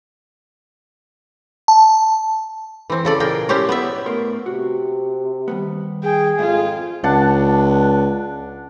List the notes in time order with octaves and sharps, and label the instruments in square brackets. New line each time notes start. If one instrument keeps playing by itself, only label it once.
[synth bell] A5
[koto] E3 C4
C#3 A4 D5
A#2 G#4 A#4 G5
C#4 E4 G4 C5 C#5
B3 D5 E5
[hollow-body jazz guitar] A2 A#4 C6 [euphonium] B3
[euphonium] C3 [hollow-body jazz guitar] F#4
[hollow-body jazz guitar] D#3 G3 B3
[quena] G#4 [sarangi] G5
[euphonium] F2 [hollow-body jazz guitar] G#2 [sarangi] F4
[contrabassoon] C#2 [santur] D4 F#5 A5